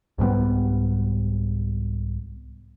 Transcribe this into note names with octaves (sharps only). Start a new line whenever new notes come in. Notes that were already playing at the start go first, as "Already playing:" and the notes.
C2 G#2 G3 B3